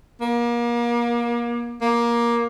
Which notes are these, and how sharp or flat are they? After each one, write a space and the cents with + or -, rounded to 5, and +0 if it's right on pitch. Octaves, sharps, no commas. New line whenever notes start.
A#3 +30
A#3 +15